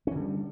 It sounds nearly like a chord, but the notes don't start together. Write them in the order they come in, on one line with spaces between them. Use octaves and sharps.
C#4 E3 D3 G3